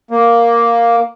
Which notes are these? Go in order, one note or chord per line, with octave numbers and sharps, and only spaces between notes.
A#3